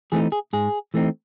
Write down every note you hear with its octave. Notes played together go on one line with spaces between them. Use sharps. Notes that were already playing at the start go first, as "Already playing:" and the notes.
E3 A3 C4 D#4 G#4
G#4
G#2 G#4
E3 A3 C4 D#4